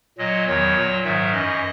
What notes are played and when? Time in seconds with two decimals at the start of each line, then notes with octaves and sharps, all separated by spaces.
0.18 A#2 F#3 D#5
0.47 E2 D#3 F#3 C#5
0.76 A#2 F#3
1.04 G#2 D#3 F#3 E5
1.32 F#2 E3 D#5